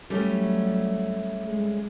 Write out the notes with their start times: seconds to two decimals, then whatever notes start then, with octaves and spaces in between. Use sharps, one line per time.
0.10 F#3 G3 A3 C#4
1.42 G#3